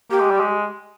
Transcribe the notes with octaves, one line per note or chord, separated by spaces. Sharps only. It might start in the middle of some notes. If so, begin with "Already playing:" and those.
A#3 G4
G#3
G3
G#3